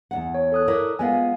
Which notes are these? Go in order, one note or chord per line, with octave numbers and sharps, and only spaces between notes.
E2 C#3 F#5
C#5
A4 D#6 F#6
E4 A#4 D5
G#3 B3 F4 F5 G#5